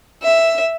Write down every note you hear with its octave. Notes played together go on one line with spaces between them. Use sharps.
E5